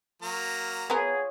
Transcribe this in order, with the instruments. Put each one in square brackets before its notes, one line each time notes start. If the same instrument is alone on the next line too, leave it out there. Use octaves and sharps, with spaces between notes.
[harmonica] F#3 A#3 A#5
[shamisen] B3 A#4 [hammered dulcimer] F4 C#5 [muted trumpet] G#4